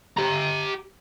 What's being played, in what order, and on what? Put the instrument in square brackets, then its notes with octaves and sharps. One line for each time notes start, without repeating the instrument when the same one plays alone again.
[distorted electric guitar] G4 A#5